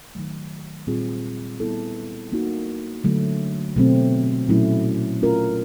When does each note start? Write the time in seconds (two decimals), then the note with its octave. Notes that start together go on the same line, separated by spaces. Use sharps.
0.15 D#3 F#3 A3
0.87 A#2 G3 C4 F4 G#4
1.60 G3 B3 E4 A4
2.32 A#3 D#4 F#4
3.04 D3 F#3 A3
3.76 B2 F#3 A3 C4
4.49 A#2 F#3 A3 C#4 E4
5.21 A3 C#4 F4 A#4